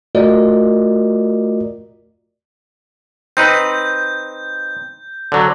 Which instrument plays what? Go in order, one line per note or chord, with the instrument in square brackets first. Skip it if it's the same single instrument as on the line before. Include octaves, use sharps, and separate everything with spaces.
[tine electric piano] A3 F4 F#4 A#4 D5 D#5
[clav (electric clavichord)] C4 D#4 B4 [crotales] G6
[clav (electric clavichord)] D3 F#3